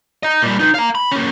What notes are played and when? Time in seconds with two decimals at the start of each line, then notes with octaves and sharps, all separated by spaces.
0.23 D#5 A#5
0.42 A#2 G3
0.60 D#4 B4
0.74 F5 A#5
0.95 B5
1.11 A#3 C#4